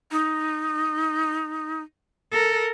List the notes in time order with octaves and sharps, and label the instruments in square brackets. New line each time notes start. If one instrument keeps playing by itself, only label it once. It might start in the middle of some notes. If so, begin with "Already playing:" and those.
[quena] D#4
[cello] A4 A#4